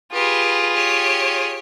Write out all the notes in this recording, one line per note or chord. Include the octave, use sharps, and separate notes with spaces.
F4 G4 G#4 B4
G4 C#5